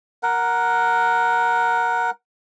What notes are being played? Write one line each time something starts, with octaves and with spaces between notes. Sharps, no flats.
A#4 F#5